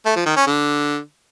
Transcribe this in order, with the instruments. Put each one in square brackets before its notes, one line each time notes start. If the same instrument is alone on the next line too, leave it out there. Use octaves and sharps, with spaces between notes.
[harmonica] A3
F3
D#3
C#4
D3